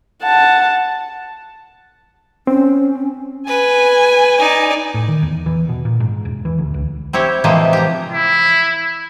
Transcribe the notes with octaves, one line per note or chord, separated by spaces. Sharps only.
F#5 A5
C4 C#4
B4 G#5
D#4 D5
A2
D#3
E2
E3
B2
A#2
G#2
E1
E3
D2
C#2
C4 E4 G4 C#5
A2 C3 E3 F3 G#3 A#3
G4 A#5
E4